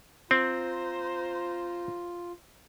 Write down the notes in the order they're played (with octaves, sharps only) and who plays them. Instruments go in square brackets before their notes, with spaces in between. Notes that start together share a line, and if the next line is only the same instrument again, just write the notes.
[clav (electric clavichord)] C4 [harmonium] F4 [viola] C5 A#5